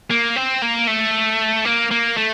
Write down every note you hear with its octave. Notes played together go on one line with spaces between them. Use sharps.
A#3
C4
A#3
A3
A#3
A#3
A3